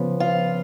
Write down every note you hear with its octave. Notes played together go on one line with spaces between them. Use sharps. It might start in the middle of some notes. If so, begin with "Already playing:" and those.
Already playing: C#3 F3 B3
F4